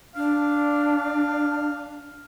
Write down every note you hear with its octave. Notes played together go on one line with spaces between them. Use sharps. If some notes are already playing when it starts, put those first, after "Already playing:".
D4 F5